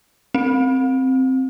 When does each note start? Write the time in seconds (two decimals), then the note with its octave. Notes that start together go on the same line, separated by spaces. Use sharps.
0.34 C4